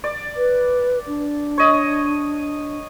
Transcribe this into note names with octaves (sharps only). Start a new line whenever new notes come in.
D5
B4
D4
C#5 D#5